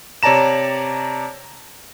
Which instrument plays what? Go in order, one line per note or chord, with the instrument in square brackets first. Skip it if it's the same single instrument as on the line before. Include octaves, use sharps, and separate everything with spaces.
[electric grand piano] C3 C#5 D5 A5 A#5 E7